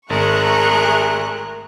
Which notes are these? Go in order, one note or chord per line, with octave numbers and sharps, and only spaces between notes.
G#1 A3 G#4 A#4 C#6 F#6